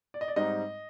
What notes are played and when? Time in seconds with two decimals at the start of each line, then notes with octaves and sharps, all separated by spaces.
0.14 D5
0.21 D#5
0.28 D5
0.36 G#2 G3 C4 D#4 D#5